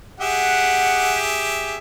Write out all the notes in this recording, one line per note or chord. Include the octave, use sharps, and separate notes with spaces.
G4 G#4 E5 F#5